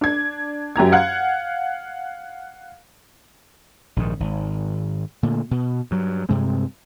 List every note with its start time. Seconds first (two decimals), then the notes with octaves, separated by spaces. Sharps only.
0.01 D4 G#6
0.76 F#2 G4 A#5 G#6
0.92 F5 F#5 F#6 G#6
3.96 A#1 G#2 D#3
4.20 G#1
5.23 A#2 D3 A3
5.51 B2
5.91 G2 F#3
6.29 G2 C3 G#3 C4